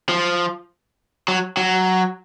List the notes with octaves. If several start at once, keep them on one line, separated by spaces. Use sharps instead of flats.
F3
F#3
F#3